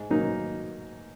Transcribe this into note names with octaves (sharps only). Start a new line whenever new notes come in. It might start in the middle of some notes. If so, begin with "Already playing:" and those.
Already playing: G#2
F#3 A#3 D#4